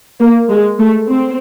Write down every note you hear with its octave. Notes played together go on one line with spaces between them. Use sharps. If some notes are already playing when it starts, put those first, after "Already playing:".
A#3
G#3
A3
C4